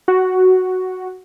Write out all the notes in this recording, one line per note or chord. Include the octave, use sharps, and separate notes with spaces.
F#4